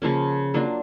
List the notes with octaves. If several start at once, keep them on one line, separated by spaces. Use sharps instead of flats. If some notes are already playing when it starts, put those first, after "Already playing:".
C#3 F3 A#3 C#4
F#3 A#3 D4 F4